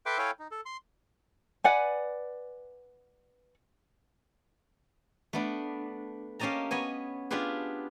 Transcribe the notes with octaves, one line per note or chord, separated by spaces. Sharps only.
A4 B4 E5 G5 C6 D6
E4 A4 C#5 F5 G5 G#5
D#4
A4
C6
B4 D5 F#5 G#5
A3 B3 D4
A#3 C#4 G4 D#5 A5 A#5
B3 C#5 D#5 G#5
B3 D4 F4 G4 G#4 B4